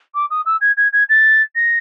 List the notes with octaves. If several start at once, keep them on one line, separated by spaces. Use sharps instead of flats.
D6
D#6
E6
G#6
G#6
G#6
A6
A#6